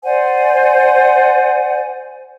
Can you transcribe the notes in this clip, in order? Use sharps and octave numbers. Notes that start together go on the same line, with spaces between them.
C5 D5 F#5 G#5